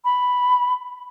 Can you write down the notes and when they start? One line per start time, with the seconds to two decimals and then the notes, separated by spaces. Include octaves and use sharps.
0.05 B5